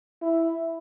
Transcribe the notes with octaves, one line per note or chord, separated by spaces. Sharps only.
E4